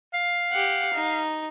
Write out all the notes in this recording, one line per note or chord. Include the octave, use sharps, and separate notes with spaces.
F5
G4 F#5
D#4